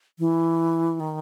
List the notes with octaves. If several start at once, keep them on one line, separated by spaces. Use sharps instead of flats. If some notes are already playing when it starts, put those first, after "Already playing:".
E3
D#3